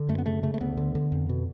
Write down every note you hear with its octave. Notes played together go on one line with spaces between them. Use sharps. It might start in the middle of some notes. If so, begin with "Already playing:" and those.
Already playing: D3
F#2 A3
B3
C#3 A3
C#3 A3
A3
D2 B3
D3
D3
F2
B2